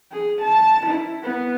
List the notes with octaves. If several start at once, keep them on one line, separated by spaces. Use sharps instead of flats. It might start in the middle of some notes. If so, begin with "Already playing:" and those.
G#4
A5
E4
B3